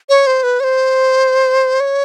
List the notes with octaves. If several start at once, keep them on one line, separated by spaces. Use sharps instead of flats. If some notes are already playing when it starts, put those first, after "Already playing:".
C#5
C5
B4
C#5
C5
C#5